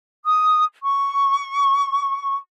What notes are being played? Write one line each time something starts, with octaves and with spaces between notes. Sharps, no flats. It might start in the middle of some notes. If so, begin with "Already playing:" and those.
D#6
C#6